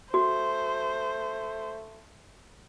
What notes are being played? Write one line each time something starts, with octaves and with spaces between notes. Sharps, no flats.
A3 F#4 C5